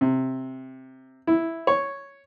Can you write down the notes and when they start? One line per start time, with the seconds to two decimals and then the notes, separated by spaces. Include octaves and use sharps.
0.01 C3
1.27 E4
1.67 C#5